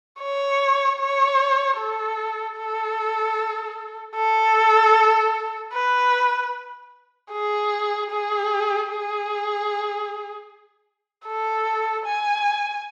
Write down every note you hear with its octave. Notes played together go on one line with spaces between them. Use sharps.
C#5
C#5
A4
A4
A4
B4
G#4
G#4
G#4
A4
G#5